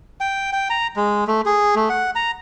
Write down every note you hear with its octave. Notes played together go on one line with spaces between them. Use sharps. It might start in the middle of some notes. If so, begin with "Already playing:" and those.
G5
G5
A#5
G#3
A3
G#4
A3
F#5
A#5